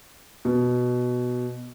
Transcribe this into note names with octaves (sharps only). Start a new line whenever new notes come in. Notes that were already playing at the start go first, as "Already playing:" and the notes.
B2